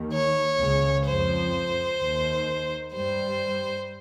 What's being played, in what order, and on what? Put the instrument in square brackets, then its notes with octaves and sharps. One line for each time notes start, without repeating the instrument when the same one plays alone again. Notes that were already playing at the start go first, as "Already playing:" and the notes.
Already playing: [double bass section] D#2 D#3
[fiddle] C#5
[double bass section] C#2 C#3
[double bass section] F2 F3 [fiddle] C5
[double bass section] D#2 D#3
[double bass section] G2 G3 [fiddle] C5